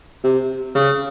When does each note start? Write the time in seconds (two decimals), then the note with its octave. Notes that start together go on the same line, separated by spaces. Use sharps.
0.24 C3
0.75 C#3